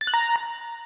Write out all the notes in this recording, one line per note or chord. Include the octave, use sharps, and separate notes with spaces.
A6
F#6
A#5